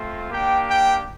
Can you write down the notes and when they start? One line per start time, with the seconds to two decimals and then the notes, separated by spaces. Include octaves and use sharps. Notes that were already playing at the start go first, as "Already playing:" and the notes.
Already playing: A3 C4 F4
0.31 A#3 D4 G4 G5
0.68 G5